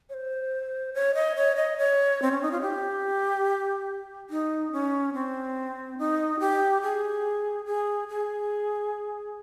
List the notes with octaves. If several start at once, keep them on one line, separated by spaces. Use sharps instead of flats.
C#5
C5
C#5
D#5
C#5
D#5
C#5
C4
C#4
D#4
F4
G4
D#4
C#4
C4
D#4
G4
G#4
G#4
G#4